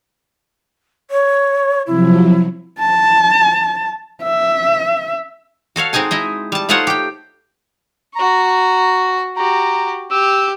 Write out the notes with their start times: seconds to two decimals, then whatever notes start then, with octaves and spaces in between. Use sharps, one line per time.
1.10 C#5
1.87 C3 F3 F#3 E4
2.80 A5
4.23 E5
5.76 F#4 A4 C#5 F5
5.93 G#3 C4 D#4 G#5 A5
6.11 D#4 E4 D#5
6.52 G3 A5
6.69 A3 D#4 F4 C5 C#5 F#5
6.87 G4 G5
8.16 F#4 A#5 C#6
9.37 F#4 G4 A#5
10.11 G4 E6